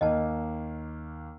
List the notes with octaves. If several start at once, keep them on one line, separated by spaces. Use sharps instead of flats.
D#2 A#3 D#5 A5